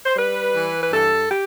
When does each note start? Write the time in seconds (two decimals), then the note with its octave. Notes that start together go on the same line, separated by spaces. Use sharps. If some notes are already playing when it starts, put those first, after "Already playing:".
0.05 C5
0.16 G3 B4
0.55 E3
0.81 B4
0.92 G2 A4
1.29 G4